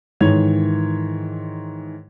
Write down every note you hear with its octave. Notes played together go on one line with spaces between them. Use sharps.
G#2 D#3 E3 C#5 G#6 F7